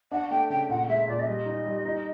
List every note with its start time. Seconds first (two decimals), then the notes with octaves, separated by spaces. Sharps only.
0.11 D4 F#5
0.31 A3 G5
0.50 C#3 G5
0.69 A#2 F#5
0.89 G#3 E5
1.08 A#2 D5
1.20 E5
1.27 G3 D#5
1.46 D#4
1.65 G3
1.85 D#4